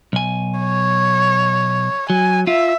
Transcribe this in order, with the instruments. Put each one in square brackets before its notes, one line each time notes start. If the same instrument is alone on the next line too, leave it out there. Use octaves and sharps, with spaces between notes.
[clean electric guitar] B1 G#5
[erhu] C#5
[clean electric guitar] F#3 [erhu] G#5
[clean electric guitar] F4 [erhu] E5